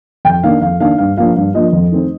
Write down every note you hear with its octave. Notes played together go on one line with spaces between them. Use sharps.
F2 G5
D#3 A#3 D4 F5
F2 F5
D#3 A#3 D4 F5
G2 F5
F3 A#3 D4 F5
G2 F5
F3 A#3 D4 D#5
F2
D#3 A3 C4 D#4